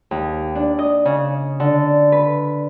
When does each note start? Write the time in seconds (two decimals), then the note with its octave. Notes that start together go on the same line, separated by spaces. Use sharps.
0.11 D#2
0.55 D4
0.79 D#5
1.05 C#3
1.60 D3
2.12 B4